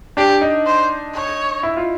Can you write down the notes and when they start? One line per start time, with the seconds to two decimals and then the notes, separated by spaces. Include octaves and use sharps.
0.17 D4 G4
0.41 D#4
0.66 C5
1.14 C#5
1.63 E4
1.77 F4